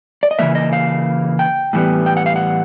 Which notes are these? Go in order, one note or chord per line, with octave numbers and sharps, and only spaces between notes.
D5
D#5
C#3 E3 G3 A#3 E5
D#5
F5
G5
A2 E3 G3 B3
G5
F#5
F5
F#5